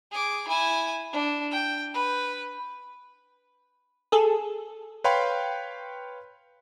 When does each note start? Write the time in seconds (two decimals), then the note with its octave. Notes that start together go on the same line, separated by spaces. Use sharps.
0.12 G#4 D6
0.48 E4 G#5
1.13 D4
1.51 G5
1.94 B4
4.12 G#4 A4
5.04 B4 C#5 F5 G5 B5 C6